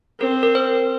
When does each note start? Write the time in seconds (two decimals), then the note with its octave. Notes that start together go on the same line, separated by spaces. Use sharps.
0.20 C4 A#4
0.43 A#4
0.55 C5